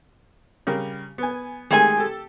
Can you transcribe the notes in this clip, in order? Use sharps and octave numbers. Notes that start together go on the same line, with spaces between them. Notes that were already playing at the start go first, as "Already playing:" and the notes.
C#3 G3 A#4
B3 G#5
D#3 G#3 A3 G4 G#4 G#5
G4 A4